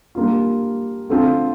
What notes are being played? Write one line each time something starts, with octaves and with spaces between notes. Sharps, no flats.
G3 A#3 D4 F4
D3 A3 C4 F4